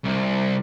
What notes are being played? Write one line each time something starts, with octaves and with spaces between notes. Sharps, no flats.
C2